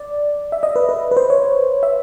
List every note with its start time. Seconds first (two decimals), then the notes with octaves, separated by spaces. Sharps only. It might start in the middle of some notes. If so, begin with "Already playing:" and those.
Already playing: D5
0.52 E5
0.63 D#5
0.76 B4
0.89 B4
1.11 B4
1.17 C5
1.30 C#5
1.83 E5